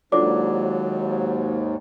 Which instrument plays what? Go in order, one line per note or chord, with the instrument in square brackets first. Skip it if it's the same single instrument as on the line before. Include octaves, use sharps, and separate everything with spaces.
[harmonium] D#2 G#2 [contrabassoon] F#3 [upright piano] D4 [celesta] F4 A4 D6